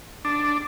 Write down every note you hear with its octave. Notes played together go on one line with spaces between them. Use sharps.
D4